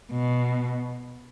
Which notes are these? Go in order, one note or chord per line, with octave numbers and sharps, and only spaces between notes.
B2